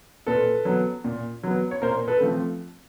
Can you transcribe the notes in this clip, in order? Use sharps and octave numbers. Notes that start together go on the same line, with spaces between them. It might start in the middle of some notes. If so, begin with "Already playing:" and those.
A#2 A4 B4
F#3 B3
A#2
F#3 B3
C#5
A#2 A#4 C5
A4 B4
F3 A3 C4